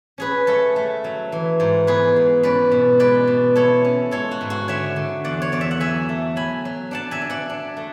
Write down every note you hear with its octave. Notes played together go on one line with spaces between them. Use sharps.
C#4 G#4 B4
A3 A4 C#5
A3
F#3
E3
G#2
B3 G#4 B4
G#2
C#4 B4 D5
B2
G#3 B4 D5
B2
E4 A4 C#5
C#4
G#3 A4 C#5
F#4
G#2
F#4
D3 C#5 E5
D3
E2 D5 F#5
C#5
E2 D5
E5
F#5
F#3 E5 G#5
A3
F#3 G#5 B5
F#3
D4 F#5 A5
E5 G#5
D4
D5 F#5
D4
A3